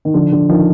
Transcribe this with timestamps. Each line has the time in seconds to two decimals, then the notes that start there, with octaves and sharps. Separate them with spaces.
0.05 D#3
0.14 D3 F3
0.32 D3
0.49 D#3 F3